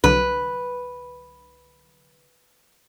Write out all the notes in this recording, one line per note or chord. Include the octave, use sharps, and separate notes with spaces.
C2 D3 F#3 B4